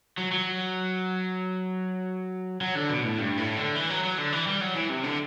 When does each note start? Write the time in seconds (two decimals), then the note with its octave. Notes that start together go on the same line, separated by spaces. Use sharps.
0.18 F#3
0.32 F#3
2.61 F#3
2.75 D3
2.90 B2
3.04 A2
3.18 G2
3.37 A2
3.56 D3
3.75 E3
3.90 F#3
4.04 F#3
4.18 D3
4.32 E3
4.47 G3
4.61 F#3
4.75 E3
4.89 C3
5.04 D3